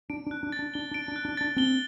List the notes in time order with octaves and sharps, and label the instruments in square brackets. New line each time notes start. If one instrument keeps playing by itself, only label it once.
[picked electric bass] D4 [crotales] D7
[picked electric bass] D4
[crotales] F#6
[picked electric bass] D4
[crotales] A6
[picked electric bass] D4
[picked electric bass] D4 [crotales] G7
[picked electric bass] D4 [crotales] D7
[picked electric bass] D4
[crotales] F#6
[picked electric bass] D4
[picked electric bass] D4 [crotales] A6
[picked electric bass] C4 D4 [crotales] G7